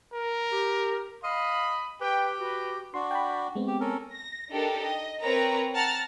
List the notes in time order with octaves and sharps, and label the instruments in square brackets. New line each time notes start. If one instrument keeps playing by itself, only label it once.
[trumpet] A#4
[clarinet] G4
[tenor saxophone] D#5 [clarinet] F5 [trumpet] B5
[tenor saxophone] G4 [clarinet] B4 [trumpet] G5
[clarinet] F#4 [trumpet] B4
[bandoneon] D4 F#4 [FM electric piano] C6
[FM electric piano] G5 A5 B5
G#3 B3 C4
[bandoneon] G4
C#4 A4 A#4
[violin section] A#6
D4 D#4 G4 A4 A#4
D#5
C4 A#4 B4 C#5 A#5
F#5 A5 A#5 F6 A6